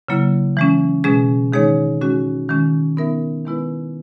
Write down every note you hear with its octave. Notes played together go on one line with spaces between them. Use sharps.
C#3 F#3 A#3 E4
E3 G#3 C#4
B2 G#3 C#4 G#4
D#3 G#3 D#4 G#4 C#5
G#3 C#4 F#4
D#3 G#3 C#4
B3 D#4 A#4 E5
D#3 G#3 B3 E4 B4